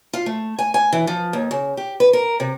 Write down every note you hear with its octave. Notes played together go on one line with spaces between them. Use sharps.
F4
A3
G#5
G#5
E3
F3
D#2
C#3
G4
B4
A#4
C3